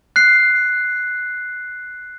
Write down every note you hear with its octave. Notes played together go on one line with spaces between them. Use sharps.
F#6 C7